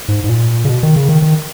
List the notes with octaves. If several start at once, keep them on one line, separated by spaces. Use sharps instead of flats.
G#2
G#2
A#2
C#3
B2
D#3
C#3
D#3
D#3